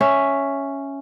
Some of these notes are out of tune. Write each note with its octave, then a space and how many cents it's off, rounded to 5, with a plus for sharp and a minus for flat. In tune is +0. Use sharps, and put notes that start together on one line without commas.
C#4 +0 E5 +0